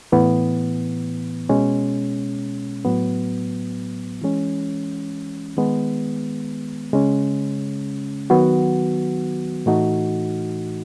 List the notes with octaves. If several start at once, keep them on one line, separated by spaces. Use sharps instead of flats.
A2 E3 B3
B2 G#3 C#4
A2 F#3 B3
E3 G#3 C#4
D#3 G#3 B3
C#3 G#3 C#4
D#3 F#3 B3 F#4
A2 E3 A3 D#4 F#4